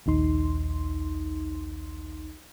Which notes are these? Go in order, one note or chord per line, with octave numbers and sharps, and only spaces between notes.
A#1 D#2 D#4 C6